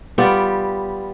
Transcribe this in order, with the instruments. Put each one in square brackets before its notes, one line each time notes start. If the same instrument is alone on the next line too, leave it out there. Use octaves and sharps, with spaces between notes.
[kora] G3 B3 F4 G4